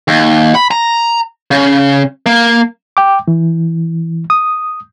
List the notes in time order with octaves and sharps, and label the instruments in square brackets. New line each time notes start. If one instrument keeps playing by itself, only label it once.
[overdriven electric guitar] D#2
B5
A#5
C#3
A#3
[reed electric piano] G5 D6
E3
D#6